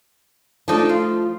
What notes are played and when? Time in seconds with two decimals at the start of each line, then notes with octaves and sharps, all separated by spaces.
0.68 F3 A3 D4 D#4 A4
0.89 F4